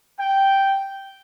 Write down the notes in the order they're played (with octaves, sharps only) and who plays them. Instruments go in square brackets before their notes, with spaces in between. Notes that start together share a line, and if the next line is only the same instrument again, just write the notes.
[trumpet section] G5